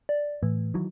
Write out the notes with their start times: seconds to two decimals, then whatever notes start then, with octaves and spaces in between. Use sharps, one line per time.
0.09 D5
0.43 A2 E3
0.74 D#3 E3 F#3